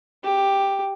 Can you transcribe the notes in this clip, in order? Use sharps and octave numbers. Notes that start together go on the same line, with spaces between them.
G4